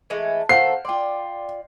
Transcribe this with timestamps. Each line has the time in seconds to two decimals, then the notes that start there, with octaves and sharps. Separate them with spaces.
0.10 E3 G#3 A3
0.49 D#3 C4 A4 C5 F5 F#5 C7
0.85 F4 D5 G5 C6